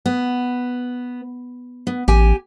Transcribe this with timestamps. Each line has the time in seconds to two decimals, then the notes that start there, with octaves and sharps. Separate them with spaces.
0.06 B3
1.87 B3
2.08 A1 G4 G#5